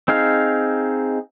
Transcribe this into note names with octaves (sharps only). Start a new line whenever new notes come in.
C4 D#4 G#4 F5